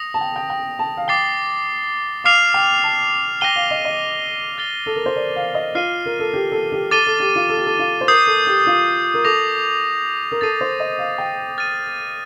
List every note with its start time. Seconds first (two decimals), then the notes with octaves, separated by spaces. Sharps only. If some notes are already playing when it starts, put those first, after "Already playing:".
Already playing: D#6 A#6 F7
0.14 A5
0.21 G5
0.36 G5
0.50 G5
0.79 A5
0.97 F5
1.08 G5 D6 A6 C7 G7
2.24 F5 D6 F6 C7 F7
2.54 G5
2.84 A5
3.41 G5 F6 A#6 D#7 G7
3.56 F5
3.71 D#5
3.85 D#5
4.58 F6 A6 C7 G7
4.86 A4
4.96 A#4
5.06 C5
5.16 D5
5.36 F5
5.55 D#5
5.75 F4 F6 C7 D#7 G7
6.06 A#4
6.19 A4
6.34 G4
6.52 A4
6.72 G4
6.91 A4 D6 A6 D#7 G7
7.06 A4
7.20 G4
7.36 F4
7.49 A4
7.57 G4
7.66 A4
7.79 F4
8.01 C5
8.08 A#4 D#6 G6 C7
8.27 A4
8.47 G4
8.67 F4
9.14 A#4
9.24 A4 D6 G6 A#6 F7
10.32 A#4
10.41 A4 A6 C7 D#7
10.61 C5
10.80 D#5
10.99 F5
11.18 G5
11.58 F6 A6 D#7